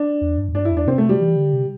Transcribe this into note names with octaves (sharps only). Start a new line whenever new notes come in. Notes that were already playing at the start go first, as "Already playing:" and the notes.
Already playing: D4
E2
G2
E2
G2 D4
E4
E2
D4
C3 C4
A3
G3
E3
D3
C3